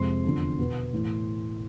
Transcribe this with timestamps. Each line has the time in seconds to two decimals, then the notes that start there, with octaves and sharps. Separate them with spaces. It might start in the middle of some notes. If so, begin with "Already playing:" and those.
Already playing: F2 C3 G#3 C4 C6
0.24 E2 D3 F3
0.59 B2 B3
0.93 A2 E3 A3